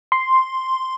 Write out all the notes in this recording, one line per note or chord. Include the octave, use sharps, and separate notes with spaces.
C6